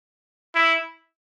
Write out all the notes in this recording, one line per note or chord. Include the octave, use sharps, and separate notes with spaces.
E4